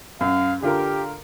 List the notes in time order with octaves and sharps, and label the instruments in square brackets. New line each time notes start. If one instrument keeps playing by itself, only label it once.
[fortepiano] F#2 [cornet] F5
[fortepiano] D3 F4 A#4 [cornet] G4